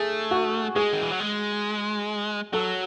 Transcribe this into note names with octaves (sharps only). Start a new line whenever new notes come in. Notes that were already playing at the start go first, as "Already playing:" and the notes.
Already playing: A3 G#4
F#4
G#3 G#4
D#3
E3
F#3
G#3
F#3 A4